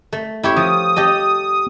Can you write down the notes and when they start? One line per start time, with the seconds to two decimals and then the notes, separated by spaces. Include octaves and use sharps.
0.12 A3
0.43 E4 G4 C#5
0.56 F3 D#6
0.96 G4 A4 D#5